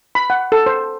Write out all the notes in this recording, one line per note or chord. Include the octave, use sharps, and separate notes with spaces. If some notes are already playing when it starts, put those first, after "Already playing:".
B5
F#5
A4
C5